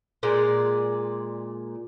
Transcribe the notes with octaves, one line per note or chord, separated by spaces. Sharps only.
A#2 G#3 D5